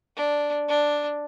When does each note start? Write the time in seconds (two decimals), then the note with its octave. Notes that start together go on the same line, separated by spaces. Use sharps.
0.16 D4
0.68 D4